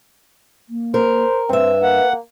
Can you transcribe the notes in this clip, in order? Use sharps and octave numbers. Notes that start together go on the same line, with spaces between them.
A#3
A#4 C5
G2 C4 B4 E5
A#3 F#5